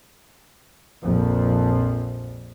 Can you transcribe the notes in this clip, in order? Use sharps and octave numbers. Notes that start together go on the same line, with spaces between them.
A#1 F2 F3